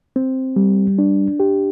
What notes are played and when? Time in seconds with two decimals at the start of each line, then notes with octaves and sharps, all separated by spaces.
0.16 C4
0.56 G3
0.98 D4
1.40 G4